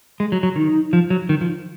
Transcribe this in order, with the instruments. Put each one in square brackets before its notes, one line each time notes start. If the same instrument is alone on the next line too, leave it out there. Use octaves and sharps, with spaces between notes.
[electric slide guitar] G#3
F#3
F#3
[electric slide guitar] D#3 [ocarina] D#4
[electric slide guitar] F3
F#3
D#3
F3